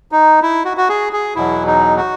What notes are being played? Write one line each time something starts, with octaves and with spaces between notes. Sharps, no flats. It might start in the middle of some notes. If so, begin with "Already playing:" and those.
D#4
E4
F#4
F#4
G#4
G#4
E2 B2 F#3 E4
D#4
F#4